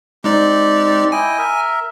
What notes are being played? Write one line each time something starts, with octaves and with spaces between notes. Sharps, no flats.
G#3 C4 D#4 G4 D5
E4 D#5 G5 G#5
A#4 E5